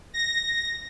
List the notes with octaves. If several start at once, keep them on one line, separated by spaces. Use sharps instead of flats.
A#6